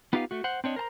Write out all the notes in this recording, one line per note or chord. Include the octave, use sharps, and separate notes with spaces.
B3 D#4 F4 G4 B4 F5
A3 F#4
C5 F#5
C4 D4 C#5 D#5
A#4 C5 A5 A#5